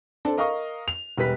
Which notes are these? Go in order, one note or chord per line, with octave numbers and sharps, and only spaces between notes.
C4 D4 A4
A#4 D#5 F5 C#6 D#6
F7
E1 G3 B4 B6